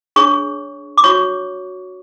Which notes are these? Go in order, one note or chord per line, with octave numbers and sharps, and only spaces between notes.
D4 G#4 C#5 C#6
D6
F#4 C#5 C#6